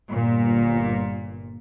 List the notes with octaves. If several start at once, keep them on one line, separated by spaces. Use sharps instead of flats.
G1 A#2